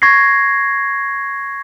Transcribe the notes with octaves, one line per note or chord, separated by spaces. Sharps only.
C#6 G#6 A#6 C7